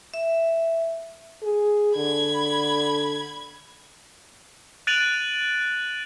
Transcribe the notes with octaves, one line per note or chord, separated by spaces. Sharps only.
E5
G#4
D3 B5 G#6
F#6 A6 D7 D#7 F7 F#7